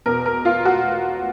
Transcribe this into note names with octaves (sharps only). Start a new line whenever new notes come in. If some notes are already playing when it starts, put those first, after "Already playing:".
E2 B2 A#4
A#4
F4
F#4